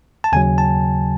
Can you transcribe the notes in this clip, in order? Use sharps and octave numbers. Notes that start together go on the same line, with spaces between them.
A5
D#2 C#3 F#3 G#5
A5